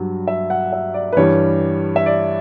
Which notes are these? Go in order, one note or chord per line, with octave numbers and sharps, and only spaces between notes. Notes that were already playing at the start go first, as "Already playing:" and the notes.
Already playing: G2 F#3
E5
F#5
E5
D5
B4
G2 E3 G3 C#5
E5
D5